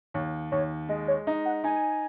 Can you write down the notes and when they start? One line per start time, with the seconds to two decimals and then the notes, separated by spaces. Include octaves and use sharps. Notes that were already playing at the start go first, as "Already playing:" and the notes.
0.14 D#2 C#5
0.52 D#2 C#5
0.89 G#3 D#5
1.08 C#5
1.27 D#4 D#5
1.45 F#5
1.64 D#4 G#5